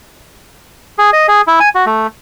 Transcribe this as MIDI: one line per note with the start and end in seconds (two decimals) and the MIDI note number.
0.98 1.10 68
1.13 1.27 75
1.28 1.41 68
1.47 1.59 64
1.60 1.69 80
1.75 1.85 66
1.86 2.07 57